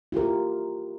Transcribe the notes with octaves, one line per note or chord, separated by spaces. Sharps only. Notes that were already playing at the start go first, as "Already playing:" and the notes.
E4 F4 G4 A#4